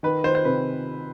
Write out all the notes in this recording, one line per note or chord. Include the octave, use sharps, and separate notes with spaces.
D#3 B4
D#3 C5
C5
C3 B4